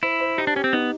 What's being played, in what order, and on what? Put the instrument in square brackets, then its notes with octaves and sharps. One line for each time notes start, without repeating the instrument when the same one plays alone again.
[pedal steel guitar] E4 [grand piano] C5
[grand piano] C5
[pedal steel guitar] D#4 [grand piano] G4
[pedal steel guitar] D4
[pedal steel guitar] C#4 [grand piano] G4
[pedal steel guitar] C4
[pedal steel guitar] B3 [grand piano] D#4